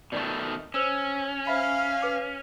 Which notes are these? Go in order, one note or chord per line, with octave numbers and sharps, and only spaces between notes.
B2 D#3 A3 D5 C#6
C#4 C5 E6 E7
C5 E5 F5 B5
B4 D6 F6